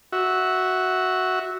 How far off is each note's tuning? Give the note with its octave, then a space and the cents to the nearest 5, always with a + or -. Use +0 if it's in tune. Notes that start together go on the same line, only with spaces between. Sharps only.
F#4 +0 E5 -10